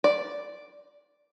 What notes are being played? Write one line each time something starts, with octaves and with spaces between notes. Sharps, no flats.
D5